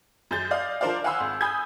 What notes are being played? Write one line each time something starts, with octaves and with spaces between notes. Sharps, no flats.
F#2 G#4 G6 A6
D5 D#5 F5
F3 D4 A#4 C5 D5 F5
F5 F#5 G#5 B5 C6 E6
G#1
G#5 B5 D#6 E6 G6 G#6